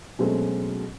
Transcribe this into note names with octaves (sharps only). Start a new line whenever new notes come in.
B2 F#3 G#3 A3 C4 C#4